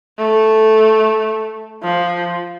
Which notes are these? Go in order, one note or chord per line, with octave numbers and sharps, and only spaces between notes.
A3
F3